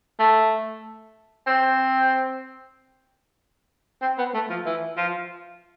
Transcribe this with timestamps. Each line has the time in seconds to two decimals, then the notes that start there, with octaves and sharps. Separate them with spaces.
0.19 A3
1.46 C4
4.01 C4
4.18 B3
4.34 A3
4.50 F3
4.66 E3
4.97 F3